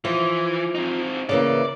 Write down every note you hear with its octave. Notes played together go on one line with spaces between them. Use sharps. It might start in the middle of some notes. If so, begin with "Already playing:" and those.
E3 F3
C4 D#4
C#3 E3 A#3 D5